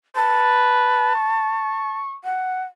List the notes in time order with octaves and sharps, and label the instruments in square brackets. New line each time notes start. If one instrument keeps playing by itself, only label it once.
[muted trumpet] B4 [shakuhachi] A5
[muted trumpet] C#6
[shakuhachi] F#5